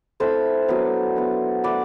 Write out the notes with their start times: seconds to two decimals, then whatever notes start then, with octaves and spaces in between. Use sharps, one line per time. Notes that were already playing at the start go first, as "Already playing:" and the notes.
0.20 A3 C4 E4 A4 C5
0.68 F#3 B3 D4
1.16 F#3 B3 D4
1.63 A3 D4 B4 D5